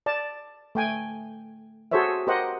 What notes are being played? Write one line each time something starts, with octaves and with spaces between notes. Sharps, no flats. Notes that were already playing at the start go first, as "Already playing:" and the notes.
D5 A5
A3 G5 G#5
F#4 G#4 A4 C5 C#5 E5
G4 A#4 C5 D#5 F#5